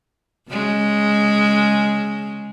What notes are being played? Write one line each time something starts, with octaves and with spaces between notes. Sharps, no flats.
C#3 G#3